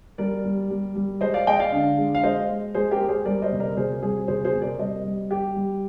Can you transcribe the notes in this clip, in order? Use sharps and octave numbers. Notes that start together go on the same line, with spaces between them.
G3 A#4 D5
G3
G3
G3
G#3 C5 D#5
D5 F5
G#3 D#5 G5
D5 F5
D3
G#3
F5
G#3 C5 D#5
G#3
G#3 G#4 C5
G4 A#4
G#3
G#4 C5
G3 A#4 D5
C5 D#5
C3
A#4 D5
C3 G#4 C5
G3 G#4 C5
C3 G#4 C5
G#4 C5
C3
A#4 D5
G3 C5 D#5
G3
G3 G4
G3